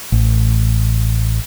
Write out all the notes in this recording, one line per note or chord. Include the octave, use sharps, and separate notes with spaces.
A1